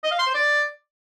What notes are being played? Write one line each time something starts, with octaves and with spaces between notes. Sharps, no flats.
D#5
F5
C6
C5
D5